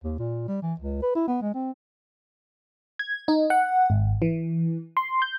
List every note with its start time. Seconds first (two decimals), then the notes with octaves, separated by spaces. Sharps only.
0.04 D#2
0.19 A#2
0.48 G3
0.62 E3
0.80 C#2
1.02 B4
1.15 E4
1.28 B3
1.42 G#3
1.54 C4
2.99 G#6
3.28 D#4
3.50 F#5
3.90 G#1
4.22 E3
4.97 C6
5.22 G6